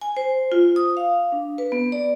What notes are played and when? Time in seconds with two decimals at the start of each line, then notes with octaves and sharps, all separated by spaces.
0.01 G#5
0.17 C5
0.52 F4
0.76 D#6
0.97 F5
1.32 D4
1.58 B4
1.72 B3
1.92 D5